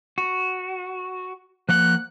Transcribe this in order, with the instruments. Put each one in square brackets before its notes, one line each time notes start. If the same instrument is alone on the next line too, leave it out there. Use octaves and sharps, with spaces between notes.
[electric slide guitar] F#4
[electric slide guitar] F3 A#3 F#5 [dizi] F#6